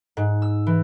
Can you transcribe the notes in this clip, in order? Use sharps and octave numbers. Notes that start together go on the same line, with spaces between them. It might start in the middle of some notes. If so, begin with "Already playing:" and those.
G#2
E6
E3